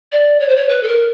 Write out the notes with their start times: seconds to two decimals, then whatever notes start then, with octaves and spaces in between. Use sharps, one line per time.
0.12 D5
0.40 C#5
0.48 C5
0.56 C#5
0.69 B4
0.83 A4
0.87 A#4